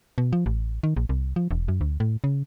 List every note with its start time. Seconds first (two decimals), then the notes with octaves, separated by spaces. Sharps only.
0.18 B2
0.33 F3
0.46 A1
0.83 D#3
0.97 A#1
1.09 C2
1.36 F3
1.51 E1
1.68 F#2
1.81 D2
2.00 A2
2.24 C#3